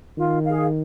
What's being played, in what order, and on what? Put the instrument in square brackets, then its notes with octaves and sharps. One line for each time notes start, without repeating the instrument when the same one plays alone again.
[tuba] D#3 [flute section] F4
[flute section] G#4 F5